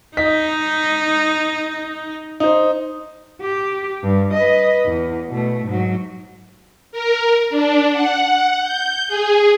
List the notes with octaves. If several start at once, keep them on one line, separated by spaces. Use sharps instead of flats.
D#4 D#5 B6
D#4 C5
G4
G2
B4 D#5
E2
B2 A3
G#2 F#3
A#4
D4
F#5
G6
G#4